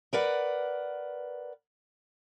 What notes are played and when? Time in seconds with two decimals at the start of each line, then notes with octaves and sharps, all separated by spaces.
0.13 A#4 B4 D5 F#5